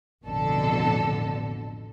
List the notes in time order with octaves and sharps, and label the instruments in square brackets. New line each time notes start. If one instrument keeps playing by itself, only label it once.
[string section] A1 F2 B2 D3 A4